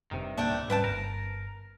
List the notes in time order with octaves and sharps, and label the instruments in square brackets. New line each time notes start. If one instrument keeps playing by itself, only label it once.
[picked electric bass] F1 [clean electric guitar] G2 C3 D#3
[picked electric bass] D1 E2 A#3 [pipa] A3 D4 G5
[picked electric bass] G#2 G3 C#4 [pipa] B4 G5 A5
[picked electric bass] G1 [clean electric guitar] A#4